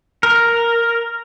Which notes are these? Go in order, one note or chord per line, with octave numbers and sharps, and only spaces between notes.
A#4